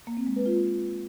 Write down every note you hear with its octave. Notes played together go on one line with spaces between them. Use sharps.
A#3
C4
G#3
B4
F4